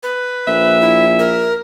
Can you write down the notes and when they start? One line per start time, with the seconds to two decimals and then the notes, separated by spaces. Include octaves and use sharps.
0.03 B4
0.47 A#1 E5
0.81 E4
1.19 A#4